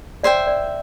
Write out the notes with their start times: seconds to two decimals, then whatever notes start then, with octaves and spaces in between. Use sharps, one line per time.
0.23 C5 D5 E5 G5
0.47 D5